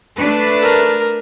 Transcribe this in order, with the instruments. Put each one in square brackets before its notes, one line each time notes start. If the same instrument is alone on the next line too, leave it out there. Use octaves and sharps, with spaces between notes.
[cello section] A3 D4 B4
[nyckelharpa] A#4